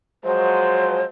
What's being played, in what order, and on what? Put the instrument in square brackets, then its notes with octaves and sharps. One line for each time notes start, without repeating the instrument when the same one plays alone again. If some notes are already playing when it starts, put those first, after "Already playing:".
[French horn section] F3 F#3 G#3 [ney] C5